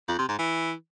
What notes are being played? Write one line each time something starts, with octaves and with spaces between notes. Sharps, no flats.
F2
C3
G#2
E3